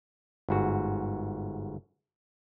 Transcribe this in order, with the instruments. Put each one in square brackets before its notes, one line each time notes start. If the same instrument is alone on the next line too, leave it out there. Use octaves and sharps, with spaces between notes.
[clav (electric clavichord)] G1 G#2 F#4